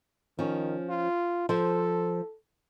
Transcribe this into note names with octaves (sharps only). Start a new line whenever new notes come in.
D#3 F3 C#4
F4
F3 A4 C5